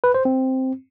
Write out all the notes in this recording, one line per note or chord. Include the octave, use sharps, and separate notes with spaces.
B4
C5
C4